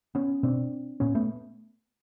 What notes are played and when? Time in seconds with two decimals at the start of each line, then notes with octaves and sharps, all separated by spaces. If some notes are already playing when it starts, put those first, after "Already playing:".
0.15 B3 C#4
0.43 B2 C4 D4
1.00 A#2 B3 C#4
1.15 A3 B3